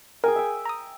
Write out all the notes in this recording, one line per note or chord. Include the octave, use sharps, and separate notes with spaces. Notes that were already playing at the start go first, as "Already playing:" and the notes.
G#4 A#4 G5 G#5
E5 G5
A#5 D#6